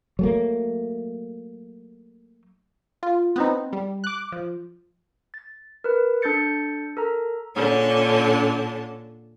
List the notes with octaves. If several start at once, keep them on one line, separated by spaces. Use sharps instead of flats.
F#3 A3 A#3
F4
B3 C4 D#4
G3
D6 F#6
F3
A6
A#4 B4
D4 A4 G6 A6 C#7
A4 A#4 A#5
A#2 D3 C#4 A5